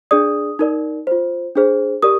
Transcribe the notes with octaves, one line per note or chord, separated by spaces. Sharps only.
D4 G#4 D5 D#6
D#4 A#4 D5
F4 C5
D4 G#4 C5
G4 A#4 D5 D#6